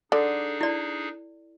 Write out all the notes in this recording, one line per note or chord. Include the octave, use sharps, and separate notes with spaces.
D3 D4 D#4 G#4 A4
E4 D5